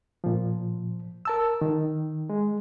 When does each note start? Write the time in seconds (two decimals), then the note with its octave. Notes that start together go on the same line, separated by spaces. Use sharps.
0.24 A#2 F3
1.25 A#4 A5 E6
1.61 D#3
2.30 G#3